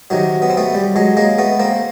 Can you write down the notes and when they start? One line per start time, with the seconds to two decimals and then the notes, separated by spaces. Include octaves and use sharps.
0.10 C3 D#3 F#3
0.42 B3
0.50 C4
0.57 A3 B3
0.75 G3
0.96 F#3 G#3
1.17 G#3 A#3
1.38 A3 B3
1.59 A#3 C4